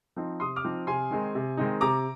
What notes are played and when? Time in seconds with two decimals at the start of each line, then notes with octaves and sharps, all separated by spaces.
0.16 F3 C4 D#4
0.40 C3 C6 D#6
0.56 D6 F6
0.64 F3 C4 D#4
0.87 C3 G#5 C6
1.11 D#3 G#3 C4 D#4
1.35 C3
1.57 D#3 G#3 C4 D#4
1.81 C3 A#5 D6